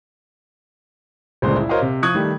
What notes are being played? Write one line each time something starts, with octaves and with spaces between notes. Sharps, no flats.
G1 C#2 A#2 G#3 C5
E4
F#4 A#4 C5 C#5 D#5 F5
C3
F3 C#6 D#6 F#6 G#6
D#3 G3 A3